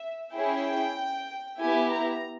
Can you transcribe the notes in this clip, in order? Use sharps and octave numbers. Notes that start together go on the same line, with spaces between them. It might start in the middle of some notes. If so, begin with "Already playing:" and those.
Already playing: E5
C#4 E4 G#4 G5
B3 E4 G4 G#5
A#5